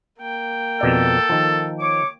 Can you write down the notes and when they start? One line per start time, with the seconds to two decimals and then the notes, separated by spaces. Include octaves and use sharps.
0.19 A#3 G5
0.81 F2 B2 A4 D5
1.29 D#3 F3
1.79 C#5 D6